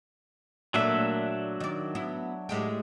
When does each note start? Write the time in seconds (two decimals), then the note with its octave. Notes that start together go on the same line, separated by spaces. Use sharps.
0.74 A#2 F#3 A3 A#3 D4 E5
1.60 D#3 D5
1.95 B3 E4
2.49 A2 G#3 G4